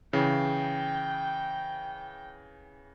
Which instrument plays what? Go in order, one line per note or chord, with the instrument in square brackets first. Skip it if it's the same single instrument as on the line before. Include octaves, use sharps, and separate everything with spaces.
[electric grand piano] C#3 E3 [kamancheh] G5